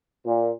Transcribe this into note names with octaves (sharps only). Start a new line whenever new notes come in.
A#2